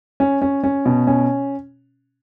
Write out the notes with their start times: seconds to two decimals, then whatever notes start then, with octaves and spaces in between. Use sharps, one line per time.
0.20 C#4
0.42 C#4
0.64 C#4
0.86 B2
1.07 C#4